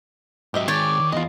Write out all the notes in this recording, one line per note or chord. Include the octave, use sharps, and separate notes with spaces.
G#2 F#3 G4 D#5 E5
D#3 G#3 G4 C#5 D5
D#3
E2 F4 D#5